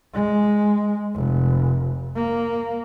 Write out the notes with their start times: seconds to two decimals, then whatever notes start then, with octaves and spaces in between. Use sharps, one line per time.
0.14 G#3
1.15 F1
2.16 A#3